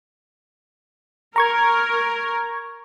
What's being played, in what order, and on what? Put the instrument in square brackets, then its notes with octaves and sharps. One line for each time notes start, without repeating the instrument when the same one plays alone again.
[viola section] A#4 [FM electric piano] A#5 C#6 G#6